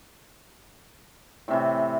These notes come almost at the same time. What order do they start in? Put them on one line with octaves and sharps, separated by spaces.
A2 C3 E3